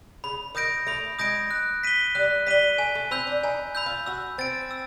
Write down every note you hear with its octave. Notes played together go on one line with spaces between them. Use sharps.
C#3 B5
D#3 D#6 G6 A#6 D7
A3 B5
G#3 D#6 G6 A#6 D7
F#6
B6 D#7 G7
G3 F#6
G3 B6 D#7 G7
A3 G#5
A3
C4 B5 E6 G6
D4
D#4 G#5
B5 E6 G6
F4
F#4 E6
C4 A6 D7
E6